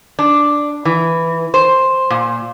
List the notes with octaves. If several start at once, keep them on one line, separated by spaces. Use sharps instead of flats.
D4
E3
C5
A#2